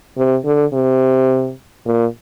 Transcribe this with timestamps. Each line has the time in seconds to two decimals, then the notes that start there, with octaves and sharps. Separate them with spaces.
0.17 C3
0.45 D3
0.73 C3
1.86 A#2